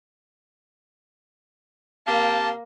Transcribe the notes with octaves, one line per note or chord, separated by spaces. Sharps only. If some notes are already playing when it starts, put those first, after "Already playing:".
C3 A#3 G4 F5 A5